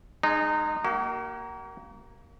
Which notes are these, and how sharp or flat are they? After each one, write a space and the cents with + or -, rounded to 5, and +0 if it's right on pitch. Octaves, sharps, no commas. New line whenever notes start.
G#3 +0 D#4 -25
A#3 +0 F#4 +45